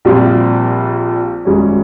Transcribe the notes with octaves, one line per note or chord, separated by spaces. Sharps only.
A#1 A#2 G3 C4 F4
G#1 G#2 G3 C#4